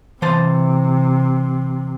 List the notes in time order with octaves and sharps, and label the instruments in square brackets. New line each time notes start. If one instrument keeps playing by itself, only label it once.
[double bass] C3 [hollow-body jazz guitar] E3 C5 A5